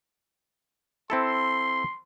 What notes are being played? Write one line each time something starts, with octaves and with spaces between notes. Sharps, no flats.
C4 E4 A4 C6